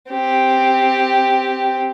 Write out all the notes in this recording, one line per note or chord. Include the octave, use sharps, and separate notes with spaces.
C4 G4